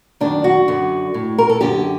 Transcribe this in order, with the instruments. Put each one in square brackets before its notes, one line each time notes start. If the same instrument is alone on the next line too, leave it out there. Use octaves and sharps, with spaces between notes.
[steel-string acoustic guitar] F#2 D#3 D4
F#4
F#2 D3
A2
A#4
A4
F#2 D3 G4